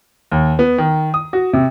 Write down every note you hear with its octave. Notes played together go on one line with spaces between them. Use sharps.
D#2
B3
D#3
D#6
F#4
C3